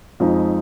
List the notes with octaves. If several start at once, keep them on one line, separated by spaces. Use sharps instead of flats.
F2 F3 G#3 D#4